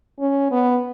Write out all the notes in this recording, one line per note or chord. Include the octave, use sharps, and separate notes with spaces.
C#4
B3